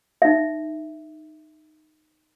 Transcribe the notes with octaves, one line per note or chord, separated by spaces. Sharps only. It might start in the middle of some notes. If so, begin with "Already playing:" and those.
D#4 E5